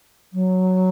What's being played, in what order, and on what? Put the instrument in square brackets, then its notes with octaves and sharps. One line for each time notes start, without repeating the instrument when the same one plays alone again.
[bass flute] F#3